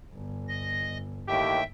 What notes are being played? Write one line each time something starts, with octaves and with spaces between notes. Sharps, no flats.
G1
D#5 A#6
D#2 A2 G4 E5 G5